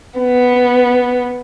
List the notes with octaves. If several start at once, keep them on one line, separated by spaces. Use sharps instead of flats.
B3